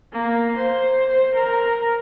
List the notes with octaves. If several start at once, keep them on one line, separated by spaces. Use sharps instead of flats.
A#3
C5
A#4